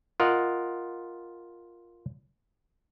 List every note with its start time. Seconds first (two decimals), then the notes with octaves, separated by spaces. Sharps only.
0.20 F4 A#4 D#5 F#5